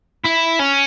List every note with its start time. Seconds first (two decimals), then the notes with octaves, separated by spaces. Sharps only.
0.24 E4
0.59 C#4